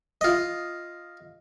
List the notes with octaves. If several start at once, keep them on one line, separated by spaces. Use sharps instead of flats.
F4 D#5